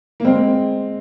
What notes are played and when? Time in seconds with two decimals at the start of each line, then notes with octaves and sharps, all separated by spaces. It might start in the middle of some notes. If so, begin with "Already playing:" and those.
0.20 A#3
0.24 G#3 C4